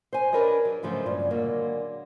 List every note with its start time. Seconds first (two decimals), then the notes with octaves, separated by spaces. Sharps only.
0.13 C5 G#5
0.32 D4 G#4 A#4 B4 C#5 D#5
0.65 F#3
0.83 G#2 C#3 F3 F#3 A3
1.06 G2 A#2 C#3
1.30 D3 F#3 G#3 A#3